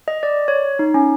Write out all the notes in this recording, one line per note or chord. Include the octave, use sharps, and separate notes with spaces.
D#5
D5
C#5
D#4
C#4